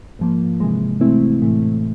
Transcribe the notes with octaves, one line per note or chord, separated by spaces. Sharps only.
G#2 F3 A#3
C3 E3 G#3
C3 E3 A3 C4 E4
A2 E3 A3